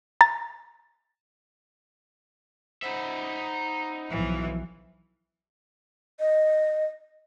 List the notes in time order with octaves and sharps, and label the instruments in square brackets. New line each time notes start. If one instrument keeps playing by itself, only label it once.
[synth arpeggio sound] A#5 A6
[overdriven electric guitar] D#4 E5 [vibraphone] C5 F#5 B5
[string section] B1 E3 F3
[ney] D#5